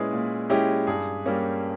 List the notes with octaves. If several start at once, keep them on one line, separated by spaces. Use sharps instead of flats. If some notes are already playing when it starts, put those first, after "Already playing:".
Already playing: A#2 G#3 C#4 E4 G#4 B4
A#2
G#3 C#4 E4 G4
G2 G#4
G3 A#3 C#4